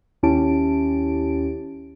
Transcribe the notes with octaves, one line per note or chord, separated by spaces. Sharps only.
D#2 C#4 E4 G4 A5 D7